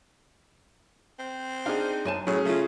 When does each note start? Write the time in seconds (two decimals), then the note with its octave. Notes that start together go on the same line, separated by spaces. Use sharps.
1.19 C4
1.66 D4 D#4 G#4 F5
2.05 F#2 G#5 A5
2.27 A2 F#3 C#4 G#4
2.45 C#3 A3 F4